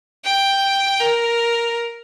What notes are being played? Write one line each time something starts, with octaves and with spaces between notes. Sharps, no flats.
G5
A#4